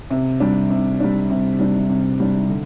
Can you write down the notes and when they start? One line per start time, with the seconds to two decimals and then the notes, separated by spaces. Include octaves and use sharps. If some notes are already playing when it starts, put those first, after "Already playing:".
0.11 C3
0.40 G3 D4
0.70 C3
1.00 G3 D4
1.30 C3
1.59 G3 D4
1.90 C3
2.20 G3 D4
2.49 D3